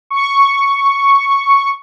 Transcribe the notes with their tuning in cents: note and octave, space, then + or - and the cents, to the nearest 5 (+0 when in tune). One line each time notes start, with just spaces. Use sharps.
C#6 +0